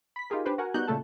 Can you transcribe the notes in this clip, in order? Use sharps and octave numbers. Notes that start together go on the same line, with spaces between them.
B5 B6
D#4 F4 G4 G#4 A#4
D4 G4 B4 C5
F#4 A#4 F#5 G#5
G3 B3 D#4 F#4 F#6 G6
A#2 C#3 A3 A4 A5